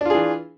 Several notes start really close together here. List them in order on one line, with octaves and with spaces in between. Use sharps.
D4 F4 G#4 E3